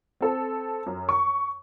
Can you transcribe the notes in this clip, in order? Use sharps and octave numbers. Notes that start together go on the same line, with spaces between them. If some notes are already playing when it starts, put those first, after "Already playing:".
C4 A4
F#2
C#6